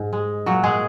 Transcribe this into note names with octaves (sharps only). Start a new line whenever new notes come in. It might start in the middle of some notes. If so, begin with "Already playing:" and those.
Already playing: G#2
G#3
A#2 F#3 F#4
G#3 G#4